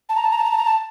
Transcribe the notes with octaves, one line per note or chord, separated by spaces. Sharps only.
A5
A#5
A5
A#5
A5
A#5
A5
A#5
A5